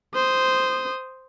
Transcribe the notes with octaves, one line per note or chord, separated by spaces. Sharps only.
C5 D#6